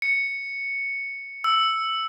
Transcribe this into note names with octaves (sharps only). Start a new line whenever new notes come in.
C#7
E6